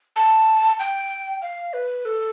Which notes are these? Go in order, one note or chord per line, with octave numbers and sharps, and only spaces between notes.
A5
G5
F5
B4
A4